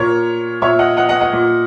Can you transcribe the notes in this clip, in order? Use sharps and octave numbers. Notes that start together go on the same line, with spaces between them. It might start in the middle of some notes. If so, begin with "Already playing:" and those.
Already playing: A#2 A#4 C#5
A#2 C#5 E5
D#5 F#5
D#5 F#5
D#5 F#5
D#5 F#5
A#2